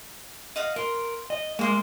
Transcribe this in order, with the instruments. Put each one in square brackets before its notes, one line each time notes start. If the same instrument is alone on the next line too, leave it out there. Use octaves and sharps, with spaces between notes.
[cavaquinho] D#5 F5 F#5
[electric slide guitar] A#4 [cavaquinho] C6
[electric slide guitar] D#5
[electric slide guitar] G#3 A#3 [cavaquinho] F4 C6 D#6